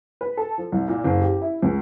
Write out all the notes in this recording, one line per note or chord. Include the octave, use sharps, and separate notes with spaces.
B4
A4
F3
C2
A#2
F#1
G4
E4
C#2